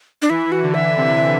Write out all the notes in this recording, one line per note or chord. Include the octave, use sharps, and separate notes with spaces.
D4
E3 E4
F#4
D3
E5
C3